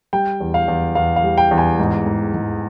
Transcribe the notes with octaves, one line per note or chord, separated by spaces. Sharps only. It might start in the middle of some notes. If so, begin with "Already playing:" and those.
G3 G5
E2
F5
E2
E2 F5
F5
G3
G5
E2
G#5
G#2
G#2
G#2